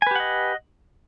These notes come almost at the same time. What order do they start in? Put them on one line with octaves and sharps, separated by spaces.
G#5 B4 G4 F#5 D#5